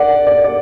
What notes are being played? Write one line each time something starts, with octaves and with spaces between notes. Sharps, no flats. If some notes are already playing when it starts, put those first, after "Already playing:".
Already playing: D5 F#5
D5
D5